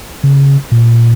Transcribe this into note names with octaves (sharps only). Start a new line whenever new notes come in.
C#3
A#2